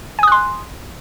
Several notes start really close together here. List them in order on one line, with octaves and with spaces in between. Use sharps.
G#5 D#6 F#6 C6